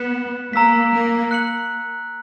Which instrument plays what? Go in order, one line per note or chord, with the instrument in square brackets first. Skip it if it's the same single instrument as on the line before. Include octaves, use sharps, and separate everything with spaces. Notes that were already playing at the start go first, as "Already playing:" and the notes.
Already playing: [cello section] B3 [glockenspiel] F#6 C#7 E7
[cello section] A#3 [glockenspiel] A#5 E6 B6
[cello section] A#3
[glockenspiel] F#6 C#7 F#7